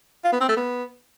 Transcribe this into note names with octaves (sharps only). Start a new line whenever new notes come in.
F4
B3
C4
A3
B3